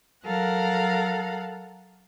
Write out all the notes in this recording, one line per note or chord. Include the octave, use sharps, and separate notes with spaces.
F#3 A4 A#4 F5 F#5